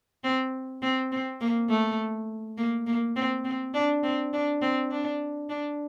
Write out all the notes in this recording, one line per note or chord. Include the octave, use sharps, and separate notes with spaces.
C4
C4
C4
A#3
A3
A#3
A#3
C4
C4
D4
C4
D4
C4
D4
D4